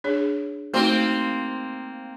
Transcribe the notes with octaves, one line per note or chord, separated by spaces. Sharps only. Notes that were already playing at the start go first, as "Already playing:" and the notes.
D4 G#4 C#5
A3 A#3 C4 D#4 F#4